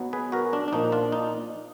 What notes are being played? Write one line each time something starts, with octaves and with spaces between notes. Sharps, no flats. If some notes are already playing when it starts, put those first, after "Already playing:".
Already playing: B1 B2 F#3 B3
G#4 B4
F#4 A#4
D4
D4
A#1 A#2 F3 A#3 D#4
D4 F4
D#4